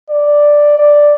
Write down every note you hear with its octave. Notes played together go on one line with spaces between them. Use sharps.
D5
D5